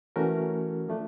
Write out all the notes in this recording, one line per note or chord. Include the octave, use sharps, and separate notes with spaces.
E3 A3 C#4 F#4 A#4
F3 A3 D4